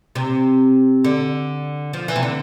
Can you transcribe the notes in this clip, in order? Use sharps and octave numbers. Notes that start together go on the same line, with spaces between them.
C3
D3
F3
E3
C3
D3